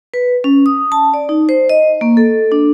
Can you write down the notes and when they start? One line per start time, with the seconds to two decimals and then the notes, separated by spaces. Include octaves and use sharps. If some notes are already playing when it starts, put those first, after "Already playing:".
0.14 B4
0.44 C#4
0.66 D#6
0.92 A5
1.14 D5
1.29 D#4
1.49 C5
1.69 D#5
2.01 A#3
2.17 A4
2.52 D4